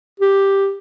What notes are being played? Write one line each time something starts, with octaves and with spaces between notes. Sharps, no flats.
G4